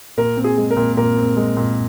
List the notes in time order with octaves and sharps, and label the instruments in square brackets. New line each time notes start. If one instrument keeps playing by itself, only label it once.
[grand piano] A#2 [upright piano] A#4
[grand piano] C4
[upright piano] G#4
[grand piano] G#3
[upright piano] A#4
[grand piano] A#2
[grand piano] A#2 [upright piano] A#4
[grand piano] C4
G#3
A#2